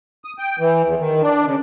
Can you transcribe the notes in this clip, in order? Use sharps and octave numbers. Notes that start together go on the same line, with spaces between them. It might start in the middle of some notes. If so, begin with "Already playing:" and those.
D#6
G5
E3
E2
D#3
D4
C#3